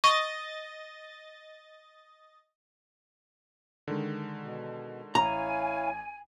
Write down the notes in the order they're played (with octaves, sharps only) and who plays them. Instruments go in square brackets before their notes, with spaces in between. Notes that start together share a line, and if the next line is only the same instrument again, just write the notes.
[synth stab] D#5 A6 [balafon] C#6
[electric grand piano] D3 D#3 G#3
[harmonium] B2
[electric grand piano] A1 [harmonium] E4 C#5 F5 [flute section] G#5 [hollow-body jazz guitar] A#5